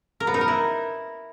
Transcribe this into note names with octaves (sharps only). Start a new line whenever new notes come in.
A#4
B3
D#4
A#4
E4